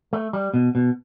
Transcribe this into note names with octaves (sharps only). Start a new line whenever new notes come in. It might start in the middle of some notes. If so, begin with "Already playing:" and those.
A3
G3
B2
B2